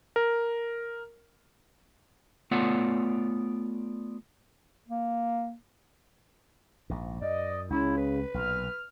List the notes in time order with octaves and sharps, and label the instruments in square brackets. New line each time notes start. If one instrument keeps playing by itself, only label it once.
[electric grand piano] A#4
[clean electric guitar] A3 B3 F4 C#5 D5 F#5
[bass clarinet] A#3
[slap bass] A#1 G#2
[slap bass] F#2 [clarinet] D5 [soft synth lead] D#5
[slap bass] C#2 [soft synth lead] C#3 [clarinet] E4
[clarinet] B4
[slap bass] B1 A#2 [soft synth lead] F6